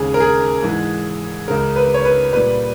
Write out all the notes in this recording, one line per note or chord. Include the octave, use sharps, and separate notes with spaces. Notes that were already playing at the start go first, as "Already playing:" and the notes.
Already playing: D#2 C#3 G#3 G#4
A#4
G#4
G#2 E3 G#3
C#2 C#3 G#3 A#4
B4
C#5
B4
A#2 G3 B4